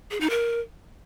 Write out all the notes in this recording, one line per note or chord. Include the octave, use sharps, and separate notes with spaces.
G#4
D#4
A#4